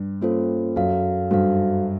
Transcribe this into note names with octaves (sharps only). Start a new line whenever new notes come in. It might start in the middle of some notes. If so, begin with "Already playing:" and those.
Already playing: G2
A#3 C#4 F4 A4 C5
F#2 F#4 A4 C#5 F5
G2 F#4 A4 C5 F5